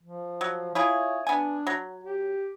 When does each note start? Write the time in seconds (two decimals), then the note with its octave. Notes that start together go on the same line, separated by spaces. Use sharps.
0.03 F3
0.41 F#3
0.75 E4 F4 G#4 C#5
1.27 B3 D4 G#5
1.67 F#3
2.04 G4